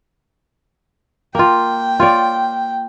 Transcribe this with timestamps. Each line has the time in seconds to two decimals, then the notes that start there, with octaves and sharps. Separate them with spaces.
1.35 A#3 F4 G5
1.99 F4 C#5 D5